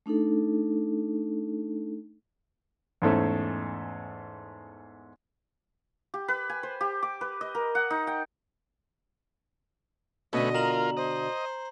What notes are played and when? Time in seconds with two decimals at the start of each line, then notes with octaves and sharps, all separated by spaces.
0.06 A3 D4 D#4 A4
3.02 E2 G#2 A3 C#4
6.14 G4
6.28 B4
6.49 G#5
6.63 C5
6.81 G4
7.03 D6
7.21 B4
7.41 D#5
7.55 A#4
7.75 F#5
7.90 D#4
8.07 G5
10.33 B2 D3 A3 C#4 B4 D#5
10.54 F4 A#4 A#5 F#7
10.97 C5 D#5